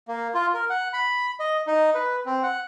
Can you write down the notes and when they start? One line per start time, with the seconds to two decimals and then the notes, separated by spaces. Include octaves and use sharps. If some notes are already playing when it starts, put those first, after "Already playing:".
0.08 A#3
0.34 F4
0.54 A#4
0.70 F#5
0.93 B5
1.40 D#5
1.67 D#4
1.95 B4
2.26 C4
2.43 F#5